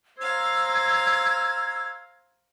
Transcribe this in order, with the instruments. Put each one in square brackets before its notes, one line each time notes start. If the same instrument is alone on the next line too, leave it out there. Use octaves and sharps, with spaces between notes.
[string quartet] C5 F5 A#5 [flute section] E6 G#6